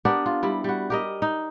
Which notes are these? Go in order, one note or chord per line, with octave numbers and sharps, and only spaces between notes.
B3 D4 G4 A#4
F4
G3 E4
G3 F#4
G4 A#4 D#5
D#4